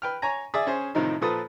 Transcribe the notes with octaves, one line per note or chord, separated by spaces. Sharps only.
B4 G5 F6
C#5 G#5 A#5
G#4 D5 E5 D#6
C#4 G#4 C5
A2 C3 D#3 F3 D#4
A#2 F3 A4 B4 D#6